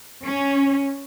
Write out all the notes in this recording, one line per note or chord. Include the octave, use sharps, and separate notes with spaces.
C#4